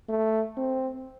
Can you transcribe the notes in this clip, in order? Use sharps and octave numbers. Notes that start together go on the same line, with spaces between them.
A3
C4